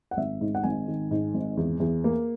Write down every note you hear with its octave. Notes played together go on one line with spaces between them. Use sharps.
F#5
G#1 E5
G#2
F#5
G#1 G#5
D#3
G#2
G#1
E2
E2
A#3